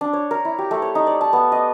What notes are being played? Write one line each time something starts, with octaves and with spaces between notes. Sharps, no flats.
D4
C#5
A#4
E4
G4
A3
C#5
D#4
D5
A5
B3
D#5